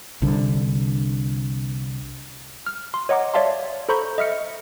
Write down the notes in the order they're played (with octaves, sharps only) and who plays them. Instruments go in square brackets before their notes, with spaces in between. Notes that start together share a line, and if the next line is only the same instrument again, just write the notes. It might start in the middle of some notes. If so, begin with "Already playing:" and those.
[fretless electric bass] C2 D3
[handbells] F6
C6
C#5 D#5 F#5 A#5 D6
C#5 D5 E5 F5 A5 C6
A4 C5 A#5 B5 C#6 G6
D#5 E5 F6 C#7